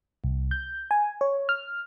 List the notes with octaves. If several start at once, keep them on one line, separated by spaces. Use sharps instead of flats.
C2
G6
G#5
C#5
F6